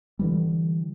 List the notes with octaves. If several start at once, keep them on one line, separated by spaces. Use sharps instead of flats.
D3 E3 G3